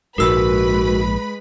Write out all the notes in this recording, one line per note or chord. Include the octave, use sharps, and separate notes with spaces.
A#1 G#2 G#3 F#4 A#4 B4 B5 E6